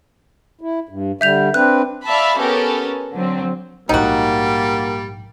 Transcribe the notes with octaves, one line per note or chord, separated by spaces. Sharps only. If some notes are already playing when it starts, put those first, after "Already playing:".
E4
G2
D3 G3 E5 G6 F7
C4 D4 B4 F#6
D5 E5 F5 A5 B5
B3 C#4 G4 A4 A#4
D3 F#3 C4
A#1 G#2 G3 A#3 D#4 F#4